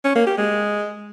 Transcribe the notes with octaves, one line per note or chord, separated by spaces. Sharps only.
C#4
A#3
G4
G#3